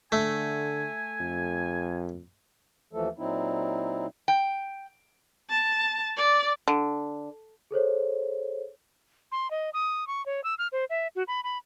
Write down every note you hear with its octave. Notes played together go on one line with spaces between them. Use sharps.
D3 A3 G#5
F2
D#2 E3 F3 A3 A4
A#2 F#3 C4 D#4 E4
G5
A5
D5
D3
G#4 A4 C5 C#5
C6
D#5
D#6
C#6
C#5
E6
F6
C5
E5
F#4
B5
B5